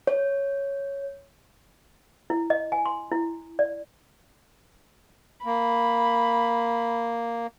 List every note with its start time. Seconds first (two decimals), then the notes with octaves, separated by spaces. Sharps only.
0.07 C#5
2.30 E4
2.50 D#5
2.72 G#5
2.86 C6
3.12 E4
3.59 D5
5.46 A#3 B5